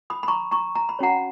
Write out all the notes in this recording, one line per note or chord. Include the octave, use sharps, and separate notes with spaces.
B5 D#6
B5
A#5 C#6
A#5 C#6
A#5
B5
C#4 F#4 C#5 F#5 A#5